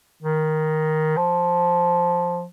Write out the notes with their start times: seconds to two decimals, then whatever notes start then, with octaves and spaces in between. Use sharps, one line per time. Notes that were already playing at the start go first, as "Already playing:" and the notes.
0.23 D#3
1.17 F3